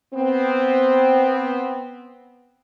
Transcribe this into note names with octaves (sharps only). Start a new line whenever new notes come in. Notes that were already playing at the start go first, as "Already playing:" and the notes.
B3 C4